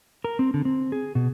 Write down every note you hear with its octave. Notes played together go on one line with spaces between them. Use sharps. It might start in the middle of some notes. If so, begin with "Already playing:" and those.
A#4
C4
D3
C4
G#4
B2